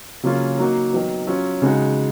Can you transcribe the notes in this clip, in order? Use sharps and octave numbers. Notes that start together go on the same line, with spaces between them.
C#3 F#3 A#3 C#4 F4
F#3 A#3 D#4 F#4
D#3 F#3 B3
F#3 C#4 F4
C#3 G#3 D#4 F#4